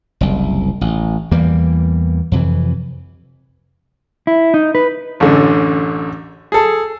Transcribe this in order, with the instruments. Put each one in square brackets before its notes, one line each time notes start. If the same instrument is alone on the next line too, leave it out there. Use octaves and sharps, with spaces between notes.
[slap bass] F#1 C2
A1
E2 E3 G3 A#3
F2 C3 E3
[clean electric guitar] E4
D#4
B4
[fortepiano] A1 F#2 D3
G#4 A4